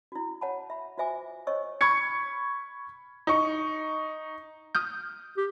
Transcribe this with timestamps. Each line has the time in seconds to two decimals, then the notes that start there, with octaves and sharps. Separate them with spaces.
0.12 E4 F#4
0.41 C#5 F#5 A5 B5
0.70 E5 B5
0.98 F4 F#4 C5 E5 G#5 D6
1.47 C5 C#5 D#5 C#6 E6
1.81 B5 C#6 G#6 C#7
3.27 D#4 C#6
4.75 D#6 F6 G6
5.37 G4